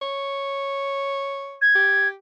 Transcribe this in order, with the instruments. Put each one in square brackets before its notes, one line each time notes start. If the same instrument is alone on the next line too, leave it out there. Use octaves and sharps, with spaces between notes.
[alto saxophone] C#5
[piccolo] G#6
[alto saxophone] G4